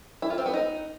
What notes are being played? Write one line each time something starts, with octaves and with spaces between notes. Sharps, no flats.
E4
F4
C4
B3
D#4